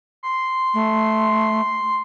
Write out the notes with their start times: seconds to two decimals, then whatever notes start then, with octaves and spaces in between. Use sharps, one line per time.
0.23 C6
0.74 A3